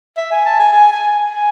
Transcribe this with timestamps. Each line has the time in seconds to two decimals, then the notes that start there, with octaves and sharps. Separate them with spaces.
0.17 E5
0.32 G#5
0.46 A5
0.59 G#5
0.73 G#5
0.92 G#5
1.30 G#5